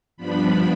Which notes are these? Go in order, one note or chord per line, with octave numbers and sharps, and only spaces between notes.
G2 F3 B3 D4 B5